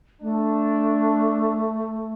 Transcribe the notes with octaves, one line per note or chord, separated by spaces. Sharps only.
A3 D4